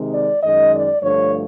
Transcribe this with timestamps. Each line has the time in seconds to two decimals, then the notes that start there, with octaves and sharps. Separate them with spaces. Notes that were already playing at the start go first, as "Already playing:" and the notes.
Already playing: C3 D#3 G#3
0.13 D5
0.42 F#2 D#3 G#3 D#5
0.72 D5
1.01 G2 D3 F3 A3 C#5